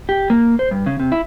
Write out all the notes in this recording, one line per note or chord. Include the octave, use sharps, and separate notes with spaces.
G4
A#3
C5
G2
C#3
C3
E4